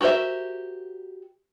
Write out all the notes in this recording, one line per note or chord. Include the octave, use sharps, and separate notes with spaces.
F#4 G4 A#4 C5 E5